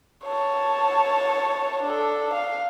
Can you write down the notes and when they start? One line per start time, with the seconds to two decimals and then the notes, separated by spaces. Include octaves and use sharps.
0.25 C#5 A5
1.83 D4 A4
2.33 F5